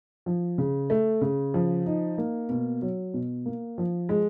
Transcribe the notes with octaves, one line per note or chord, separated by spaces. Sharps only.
F3
C#3
A3
C#3
F3
D#4
A#3
B2
F#3
B2
A#3
F3
G#3